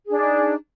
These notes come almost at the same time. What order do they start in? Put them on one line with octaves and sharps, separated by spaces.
G#4 D4 D#4